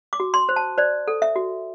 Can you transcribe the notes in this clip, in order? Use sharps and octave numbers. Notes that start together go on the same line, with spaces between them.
D6
F#4
C6
C5
A5
C5 D5
A4
E5
F#4